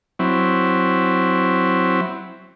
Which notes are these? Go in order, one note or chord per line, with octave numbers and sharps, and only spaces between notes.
F#3 C4 E4